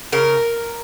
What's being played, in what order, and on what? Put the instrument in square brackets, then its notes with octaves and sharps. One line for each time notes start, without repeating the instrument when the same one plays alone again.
[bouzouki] C#3 A#4